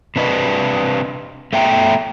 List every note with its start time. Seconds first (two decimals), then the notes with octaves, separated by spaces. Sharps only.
0.16 C3 D4 B4 D#5
1.53 A3 B3 E5 G5 A#5